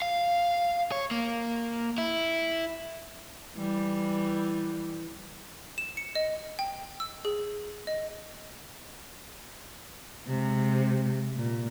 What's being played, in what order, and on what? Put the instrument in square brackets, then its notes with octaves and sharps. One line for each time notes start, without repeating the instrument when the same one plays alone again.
[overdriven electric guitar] F5
C#5
A#3
E4
[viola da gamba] E3 G3
[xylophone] E7
C#7
D#5
G5
E6
G#4
D#5
[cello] C3 G#3
A#2